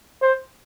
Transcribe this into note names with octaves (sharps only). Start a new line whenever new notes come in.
C5